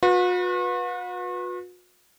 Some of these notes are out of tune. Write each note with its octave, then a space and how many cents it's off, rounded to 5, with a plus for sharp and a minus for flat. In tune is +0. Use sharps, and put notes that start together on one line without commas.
F#4 -45 B4 -10